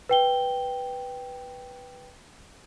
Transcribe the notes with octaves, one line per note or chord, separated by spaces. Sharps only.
B4 G5 G7